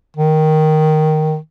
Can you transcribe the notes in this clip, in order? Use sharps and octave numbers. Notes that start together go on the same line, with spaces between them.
D#3